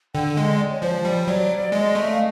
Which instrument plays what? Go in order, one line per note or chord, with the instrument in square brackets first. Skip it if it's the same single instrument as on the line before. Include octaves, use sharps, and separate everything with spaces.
[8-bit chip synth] D3 [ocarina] G5
[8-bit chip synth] G#3 [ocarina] D#5
[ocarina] D5
C#5
[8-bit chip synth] F3 [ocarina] C5
[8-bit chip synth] G3
[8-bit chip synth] F#3 [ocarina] D5
[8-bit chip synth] G#3 [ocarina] D#5
[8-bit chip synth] A3
[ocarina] F5